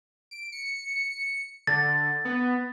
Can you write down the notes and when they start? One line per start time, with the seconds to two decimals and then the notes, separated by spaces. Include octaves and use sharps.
0.31 D7
0.52 C#7
1.67 D3 A6
2.25 B3